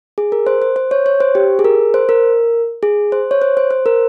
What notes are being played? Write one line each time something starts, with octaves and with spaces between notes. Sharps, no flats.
G#4
A#4
C5
C5
C5
C#5
C#5
C5
G4
G#4
A#4
C5
A#4
G#4
C5
C#5
C5
C5
C5
A#4